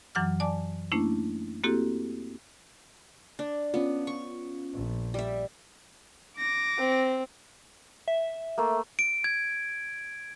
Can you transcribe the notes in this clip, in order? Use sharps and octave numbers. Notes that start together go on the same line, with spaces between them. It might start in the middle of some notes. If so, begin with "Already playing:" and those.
F#2 E3 F#3 F#5 D6 F6
D5 G#5 A5 D6
A3 A#3 C#4 D4 E4
A#3 C4 E4 F#4 G4 A4
D4
B3 C#4 F4
C#6
A#1
G3 E5
D6 A#6
C4
E5
A3 A#3
D7
G#6